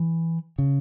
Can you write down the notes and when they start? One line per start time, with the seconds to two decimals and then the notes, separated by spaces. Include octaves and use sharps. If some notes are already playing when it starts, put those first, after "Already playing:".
Already playing: E3
0.58 C#3